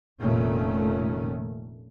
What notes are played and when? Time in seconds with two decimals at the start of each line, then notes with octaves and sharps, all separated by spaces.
0.20 F1 A#2 D#3 A3 C#4